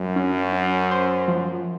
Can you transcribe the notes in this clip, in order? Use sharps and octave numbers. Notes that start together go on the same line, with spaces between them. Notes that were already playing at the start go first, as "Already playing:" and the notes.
Already playing: F#2 F#3
C#4
C#4
C5
F3